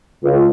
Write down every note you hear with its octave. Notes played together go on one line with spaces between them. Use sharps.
C#2